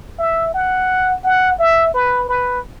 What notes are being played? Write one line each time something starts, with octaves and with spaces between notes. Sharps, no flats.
E5
F#5
F#5
E5
B4
B4